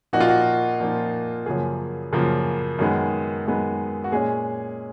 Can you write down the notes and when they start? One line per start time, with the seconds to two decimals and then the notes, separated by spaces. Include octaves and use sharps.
0.13 A#2 F3 A#3 D#4 F#4
0.20 F4
0.28 F#4
0.80 A#2 F3 A#3 D#4
1.46 F#2 C#3 F3 A#3 G#4
2.13 F#2 C#3 F3 A#3
2.79 F#2 D#3 G#3 B3
3.46 F#2 D#3 G#3 B3
4.04 F#4
4.12 A#2 G#3 C#4 G#4